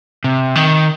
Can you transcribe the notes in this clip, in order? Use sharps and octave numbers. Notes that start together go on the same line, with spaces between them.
C3
D#3